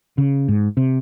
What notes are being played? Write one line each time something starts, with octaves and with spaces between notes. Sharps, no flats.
C#3
G#2
C3